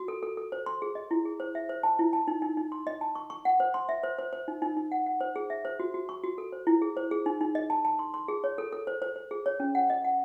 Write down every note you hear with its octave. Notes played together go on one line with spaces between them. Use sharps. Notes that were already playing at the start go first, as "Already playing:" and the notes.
Already playing: F#4
A4
A4
A4
C5
C6
G#4
D#5
E4
G#4
C5
E5
C5
A5
E4
A5
D#4
D#4
D#4
C6
D#5
A5
C#6
C#6
F#5
C5
C6
E5
C5
C5
C5
D#4
D#4
D#4
F#5
F#5
C5
G#4
E5
C5
F#4
F#4
C#6
F#4
A4
C5
E4
G#4
C5
G#4
D#4
D#4
D#5
A5
A5
C6
C6
G#4
C#5
A4
A4
C5
C5
C5
G#4
C#5
C#4
F#5
D#5
F#5